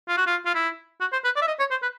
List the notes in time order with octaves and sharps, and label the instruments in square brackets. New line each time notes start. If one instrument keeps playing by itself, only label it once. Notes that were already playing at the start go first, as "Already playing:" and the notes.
[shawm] F4
F#4
F4
F4
E4
F#4
C5
B4
D5
E5
D#5
C#5
C5
B4